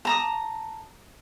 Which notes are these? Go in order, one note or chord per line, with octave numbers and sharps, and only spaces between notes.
A5 A#5 D#6